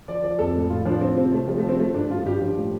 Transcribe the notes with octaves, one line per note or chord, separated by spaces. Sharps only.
F3 D5
F3 D5
F2 A4
A2
A2 F4
F3 D4
F3 C4
C3 C4
C3 A3
F3 G3
A3
F3
C4
F3 A3
G2 D4
G2 F4
G2 G4
F3
A2